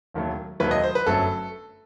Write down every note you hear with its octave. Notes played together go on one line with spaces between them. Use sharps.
E1 D#2 D#3 F#3 A3
E1 D#2 D#3 F#3 A3 B4
D#5
C5
B4
G1 F#2 F#3 A3 A4